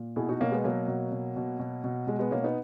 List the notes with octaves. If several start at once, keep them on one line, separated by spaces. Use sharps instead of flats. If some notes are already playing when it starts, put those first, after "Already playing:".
Already playing: A#2
B2 E4 G#4
D#4 F#4
B2 A#3 C#4
G#3 B3
B2 F#3 A#3
B2
B2
B2
B2
B2
B2 G#3
G#3 B3
B2 A#3 C#4
B3 D#4